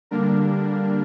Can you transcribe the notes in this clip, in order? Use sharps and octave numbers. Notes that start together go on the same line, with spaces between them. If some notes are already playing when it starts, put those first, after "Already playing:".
D3 G3 A#3 D4 A#4